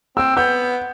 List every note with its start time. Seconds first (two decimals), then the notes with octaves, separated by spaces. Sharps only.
0.17 C4 E6
0.37 B3 G6